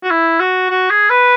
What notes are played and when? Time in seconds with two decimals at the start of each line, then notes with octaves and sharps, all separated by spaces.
0.03 F#4
0.11 E4
0.40 F#4
0.70 F#4
0.90 G#4
1.10 B4